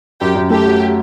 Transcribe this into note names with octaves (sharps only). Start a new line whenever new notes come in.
F#2 G4
F#2
A3 G4
F#3